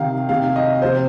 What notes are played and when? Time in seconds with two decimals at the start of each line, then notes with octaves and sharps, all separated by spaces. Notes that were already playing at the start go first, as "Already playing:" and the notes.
Already playing: C3 D#3 F5
0.29 C3 D#3 F5
0.56 D#5
0.82 C3 F3 C5